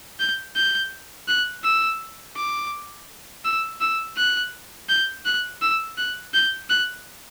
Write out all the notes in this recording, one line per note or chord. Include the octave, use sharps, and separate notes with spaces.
G6
G6
F#6
E6
D6
E6
E6
F#6
G6
F#6
E6
F#6
G6
F#6